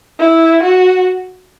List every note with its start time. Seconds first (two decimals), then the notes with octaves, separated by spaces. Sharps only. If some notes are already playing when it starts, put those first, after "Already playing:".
0.20 E4
0.63 F#4